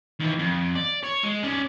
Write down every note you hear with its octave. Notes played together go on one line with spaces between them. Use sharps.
D#2 E3
F2
D5
C#5
G#3
C#4 D5